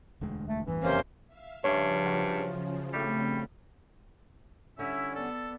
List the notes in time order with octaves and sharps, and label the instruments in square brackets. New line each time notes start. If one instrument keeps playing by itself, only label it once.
[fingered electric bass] E1 D2 G#3
[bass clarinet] A3
[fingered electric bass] A1 E2 G2 [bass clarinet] E3
[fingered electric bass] F#1 F2 [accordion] C3 A#3 C#4 [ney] C5
[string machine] E5 F5
[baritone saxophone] G2 [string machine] C#3 F3 [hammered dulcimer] C#4 F4 [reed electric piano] C#5 E5
[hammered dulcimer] F#3 F4
[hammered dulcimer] A2 A3 D4 [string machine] C#3 C4 [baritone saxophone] G3
[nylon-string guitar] D3 G3 [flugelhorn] C#4 [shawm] E4 [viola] E5
[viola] B3 D5 [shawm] A4